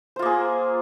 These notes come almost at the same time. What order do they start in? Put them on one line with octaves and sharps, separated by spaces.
C5 F4 A#3 G#4